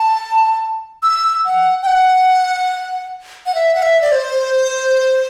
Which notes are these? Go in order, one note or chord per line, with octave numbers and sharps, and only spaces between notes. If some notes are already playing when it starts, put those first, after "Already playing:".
Already playing: A5
E6
F#5
G5
F#5
F#5
E5
F#5
E5
D5
C5